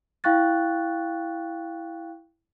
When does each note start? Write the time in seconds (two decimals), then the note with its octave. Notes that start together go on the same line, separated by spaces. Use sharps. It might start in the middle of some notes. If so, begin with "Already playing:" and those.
0.24 E4 F5 G5 C#6 F#6 A6